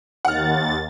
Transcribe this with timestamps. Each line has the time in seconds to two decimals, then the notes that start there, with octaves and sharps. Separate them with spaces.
0.25 D#2 F#5 F6 A6